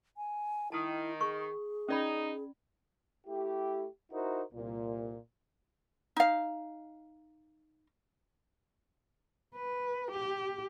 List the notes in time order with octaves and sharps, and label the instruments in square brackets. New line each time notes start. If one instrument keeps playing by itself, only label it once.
[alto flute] G#5
[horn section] D#3 [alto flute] E4 [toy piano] A5 D#6
[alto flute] G#4 [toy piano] C#6
[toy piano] C#4 D5 B5 [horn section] D#4
[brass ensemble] A3 E4 G4
D#4 E4 F#4 A#4 C5
C2 A#2
[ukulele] D#4 F5
[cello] B4
G4